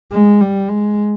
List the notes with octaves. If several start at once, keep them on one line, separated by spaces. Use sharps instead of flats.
G#3
G3
G#3